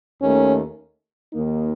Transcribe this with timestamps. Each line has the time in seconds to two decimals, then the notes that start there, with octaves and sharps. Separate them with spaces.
0.21 D#2 D#3 A3 C#4
1.33 D#2 D#3 A#3 D#4